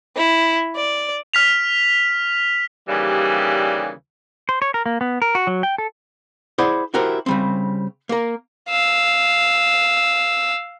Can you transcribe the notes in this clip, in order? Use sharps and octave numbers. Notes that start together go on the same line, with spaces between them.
E4
D5
F6 B6 F7
D#2 C#3 E3 G3
C5
C#5
A#4
A#3
B3
A#4
F#4
F#3
G5
A4
E4 G#4 C5 D5 F#5
E4 F#4 G4 A#4 C5
C#3 G3 C4
A#3 A#4
F5 E6